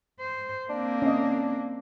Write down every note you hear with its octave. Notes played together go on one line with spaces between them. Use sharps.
C5
A#3 C4 D4
C#4 D#5